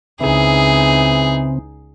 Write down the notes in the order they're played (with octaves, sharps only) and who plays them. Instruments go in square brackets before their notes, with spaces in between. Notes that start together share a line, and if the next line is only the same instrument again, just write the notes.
[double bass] C#2 D#4 [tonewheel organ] C#3 C4 [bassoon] E3 [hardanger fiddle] G#4